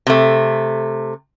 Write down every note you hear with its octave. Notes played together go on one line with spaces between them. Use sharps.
C3 A3